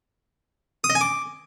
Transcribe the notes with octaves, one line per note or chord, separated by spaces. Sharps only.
D#6
D#5
G#5
D6